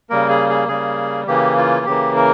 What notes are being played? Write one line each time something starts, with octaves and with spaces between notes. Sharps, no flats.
C#3 G3 A#3 A#4
G#4
G#4
C#3 G3 A#3 G#4
C#3 E3 A#3 G4
F4
C#3 E3 A#3 G4
A#4